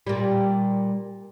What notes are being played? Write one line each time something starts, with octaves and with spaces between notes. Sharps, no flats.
A#2 G3